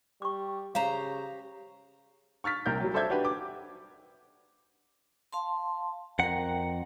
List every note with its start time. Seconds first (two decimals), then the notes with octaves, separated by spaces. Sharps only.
0.22 G3 C#6 D6
0.75 C#3 G4 C5 F5 A#5
2.44 C#6 F6 A6 B6
2.66 C2 C3 A#4 G6
2.80 F#3 G3
2.94 A4 C5 D5 E5 G6 G#6
3.10 D4 F#4 G4 B4
3.25 D6
5.33 F5 A5 C6
6.19 F2 A#4 F#5 G5 A#5